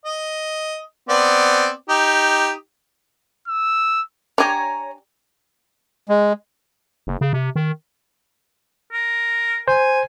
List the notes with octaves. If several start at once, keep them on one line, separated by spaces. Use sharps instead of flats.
D#5
B3 C4 D5
D#4 G4
E6
D4 G4 C#5 G#5 A#5
G#3
F#1
C#3
C3
D#3
A#4
C5 G#5